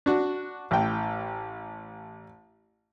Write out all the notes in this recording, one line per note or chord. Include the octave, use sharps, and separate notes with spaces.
D4 F#4
A1 G5